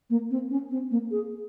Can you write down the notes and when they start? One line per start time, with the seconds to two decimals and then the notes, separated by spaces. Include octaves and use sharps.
0.10 A#3
0.31 C4
0.50 C#4
0.71 C4
0.91 A#3
1.11 G#4